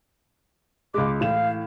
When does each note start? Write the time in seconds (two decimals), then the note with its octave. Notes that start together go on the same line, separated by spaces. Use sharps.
0.94 C#2 G#3 D6
1.21 A2 E3 F5 E7